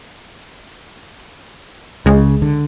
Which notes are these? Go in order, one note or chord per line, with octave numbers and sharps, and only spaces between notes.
C#2 C#3 G#3
D3